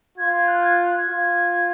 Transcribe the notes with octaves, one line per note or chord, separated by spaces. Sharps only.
F4 G#6
G#6
F#6
G#6
F#6
G#6
F4